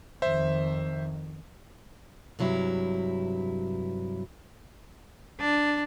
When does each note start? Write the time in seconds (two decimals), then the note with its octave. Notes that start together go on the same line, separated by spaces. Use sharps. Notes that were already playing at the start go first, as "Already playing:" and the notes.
0.22 F2 D#3 C5 E5
2.39 G2 C3 F#3 E4
5.40 D4